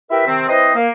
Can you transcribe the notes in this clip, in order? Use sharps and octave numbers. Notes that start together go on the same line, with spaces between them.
E4 G4 A#4 B4 E5
C3 D#3 C4
C4 E4 B4 C5 D#5
A#3